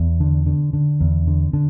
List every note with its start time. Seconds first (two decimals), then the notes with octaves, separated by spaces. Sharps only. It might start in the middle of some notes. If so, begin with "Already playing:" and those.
Already playing: E2
0.20 D3
0.46 D3
0.73 D3
1.00 E2
1.27 D3
1.53 D3